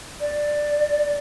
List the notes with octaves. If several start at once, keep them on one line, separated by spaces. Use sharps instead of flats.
D5